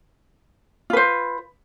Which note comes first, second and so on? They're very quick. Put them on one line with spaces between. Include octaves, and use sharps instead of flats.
F4 B4 C5